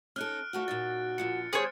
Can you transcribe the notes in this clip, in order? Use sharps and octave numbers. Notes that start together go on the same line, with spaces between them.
C#4 D#4 A4 F6 F#6 D7
D#2 A3 F4 F#4
A#2 C#3 D#4 A6
A#2 D3 F3 C#7
D3 G3 B3 G#4 C5 C#5